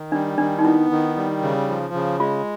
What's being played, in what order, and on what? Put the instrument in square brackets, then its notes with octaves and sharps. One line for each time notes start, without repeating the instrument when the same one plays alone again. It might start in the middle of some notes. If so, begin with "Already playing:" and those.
Already playing: [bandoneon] D#3
[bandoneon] G3 [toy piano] D4
[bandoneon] D#3 [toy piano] D4
[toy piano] D#4
[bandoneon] B3 [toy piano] E4
[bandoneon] D#3
G3
C#3
F3
C#3
[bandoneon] G#3 [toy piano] F4